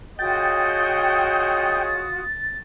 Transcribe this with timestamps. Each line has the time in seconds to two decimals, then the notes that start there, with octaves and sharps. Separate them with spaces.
0.19 F4 F#4 G#4 C#5 D#5 G5 D#6 A6